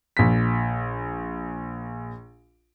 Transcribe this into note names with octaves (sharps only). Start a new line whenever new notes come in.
A#1 B6